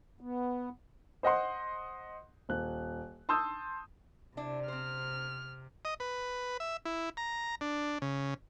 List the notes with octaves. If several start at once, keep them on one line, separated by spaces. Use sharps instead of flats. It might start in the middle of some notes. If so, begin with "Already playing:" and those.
B3
C5 D#5 F#5 C6
D#1 F#6
A5 C6 D#6 E6 G6
C3 D4 E4
C4 C5 F6
D#5
B4
E5
E4
A#5
D4
C#3